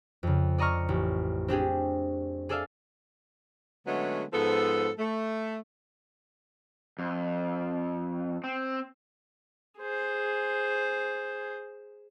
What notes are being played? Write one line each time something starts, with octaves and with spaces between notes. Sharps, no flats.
F2 C#3
D5 D#5 A#5 C#6 F6
A1
C4 D4 G4 G#4
G#4 A4 D5 E5 F5
D3 F#3 G#3 A3 B3 C#4
G#2 F3 B3 A4
A3
F2
C4
G#4 C5